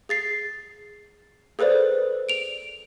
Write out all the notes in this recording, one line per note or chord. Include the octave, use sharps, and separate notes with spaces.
G#4 A6 C7
G#4 A4 B4 C5 D5
D7 F7